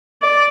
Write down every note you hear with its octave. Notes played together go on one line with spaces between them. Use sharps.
D5